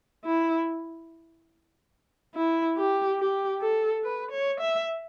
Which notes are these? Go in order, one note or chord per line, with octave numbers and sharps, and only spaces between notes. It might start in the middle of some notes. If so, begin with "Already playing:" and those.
E4
E4
G4
G4
A4
B4
C#5
E5